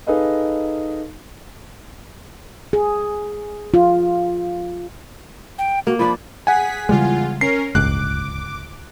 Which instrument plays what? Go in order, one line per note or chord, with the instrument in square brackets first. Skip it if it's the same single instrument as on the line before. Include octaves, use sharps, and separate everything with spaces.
[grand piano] D#4 G#4 A4 B4 D#5 F5
[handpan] G#4
F4
[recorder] G5
[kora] A#3 [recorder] F#4
[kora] F3 D4 [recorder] B5
[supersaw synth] G#4 B6 [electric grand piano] F#5 G#5
[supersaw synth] E2 F4 [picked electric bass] C#3 G3 G#3
[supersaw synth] C#4 A#4 [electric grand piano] C7
[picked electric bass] D1 G1 C#2 [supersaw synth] D6 [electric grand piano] F#6